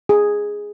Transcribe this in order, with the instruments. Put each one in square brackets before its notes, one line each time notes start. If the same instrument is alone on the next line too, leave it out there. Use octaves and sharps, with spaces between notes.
[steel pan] G#4